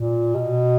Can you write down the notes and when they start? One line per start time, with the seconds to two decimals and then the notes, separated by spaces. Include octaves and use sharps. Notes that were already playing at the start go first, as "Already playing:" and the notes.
Already playing: A#2
0.35 B2